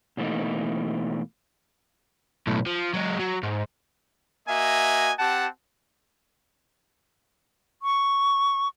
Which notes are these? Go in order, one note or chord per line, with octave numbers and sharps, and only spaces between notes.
B2 E3 A3 A#3 D#4
B1 A2
F3
F#3 G#3
F#3
G#2
A#3 F#4 D#5 E5 G#5
C4 G4 F#5 A5
C#6